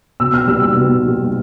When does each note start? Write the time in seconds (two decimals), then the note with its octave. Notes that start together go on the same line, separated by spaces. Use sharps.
0.20 B2 E6
0.34 F6
0.47 G3 A#3 D#4 E6
0.62 E6
0.76 B2
1.05 G3 A#3 D#4